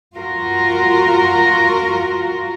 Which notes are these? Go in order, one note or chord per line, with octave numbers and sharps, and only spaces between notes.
F4 F#4 A#4